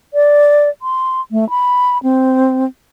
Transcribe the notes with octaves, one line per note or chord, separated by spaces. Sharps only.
D5
C6
A3
B5
C4